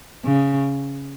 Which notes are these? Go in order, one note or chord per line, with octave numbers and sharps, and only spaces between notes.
C#3